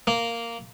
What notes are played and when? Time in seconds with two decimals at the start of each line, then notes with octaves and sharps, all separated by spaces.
0.07 A#3